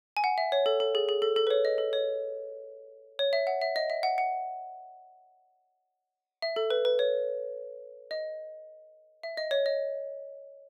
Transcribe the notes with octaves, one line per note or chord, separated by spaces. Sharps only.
G#5
F#5
E5
C#5
A4
A4
G#4
G#4
A4
A4
B4
C#5
D#5
A4
C#5
C#5
E5
F#5
E5
D#5
E5
F#5
F#5
E5
A4
B4
B4
C#5
D#5
E5
D#5
C#5
D#5